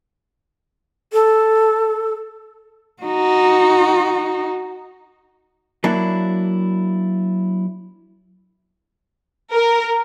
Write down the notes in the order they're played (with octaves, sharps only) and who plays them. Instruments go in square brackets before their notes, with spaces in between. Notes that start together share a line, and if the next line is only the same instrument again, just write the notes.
[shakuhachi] A4
[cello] D#4 F#4
[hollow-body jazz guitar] F#3 A#3 D4 E4
[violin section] A#4